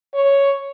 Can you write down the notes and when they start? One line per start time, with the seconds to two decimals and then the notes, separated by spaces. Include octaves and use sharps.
0.14 C#5